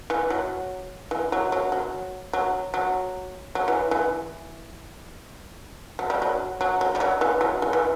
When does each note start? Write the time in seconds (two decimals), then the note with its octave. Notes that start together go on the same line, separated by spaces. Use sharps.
0.10 E3
0.30 F#3
1.11 E3
1.32 F#3
1.52 F#3
1.72 F#3
2.33 F#3
2.74 F#3
3.55 F#3
3.68 E3
3.91 E3
5.99 F#3
6.10 G3
6.22 F#3
6.61 F#3
6.81 F#3
6.95 G3
7.00 F#3
7.21 E3
7.41 F#3
7.62 E3
7.73 E3